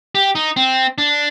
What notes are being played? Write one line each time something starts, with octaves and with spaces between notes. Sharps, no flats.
G4
D#4
C4
D4